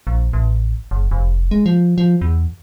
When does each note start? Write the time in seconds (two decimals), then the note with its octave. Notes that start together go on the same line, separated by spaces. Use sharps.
0.07 A#1
0.33 A1
0.91 F#1
1.11 F1
1.51 G#3
1.66 F3
1.98 F3
2.21 E2